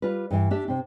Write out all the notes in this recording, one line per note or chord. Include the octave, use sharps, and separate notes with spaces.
G3 F4 B4
G2 E3
D4 G4 E5
C3 C4